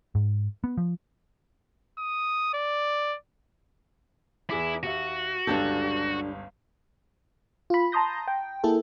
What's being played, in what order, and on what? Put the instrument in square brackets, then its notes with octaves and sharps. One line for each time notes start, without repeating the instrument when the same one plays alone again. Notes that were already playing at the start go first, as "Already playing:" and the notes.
[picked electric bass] G#2
B3
F3
[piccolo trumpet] D#6
D5
[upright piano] E2 G#4 D6 [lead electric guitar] E4
[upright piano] D#2 E5 [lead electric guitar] F#4
[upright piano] G1 C#2 G6 [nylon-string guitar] D4 G4 A4
[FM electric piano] F4 B5
A5 A#5 C6 D#6 G6 A#6
G5
A#3 E4 G#4 A4